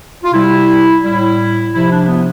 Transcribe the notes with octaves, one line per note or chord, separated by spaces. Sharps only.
F4
C3 G3 E4
A2 G3 E4
C3 F3 E4
D4
B3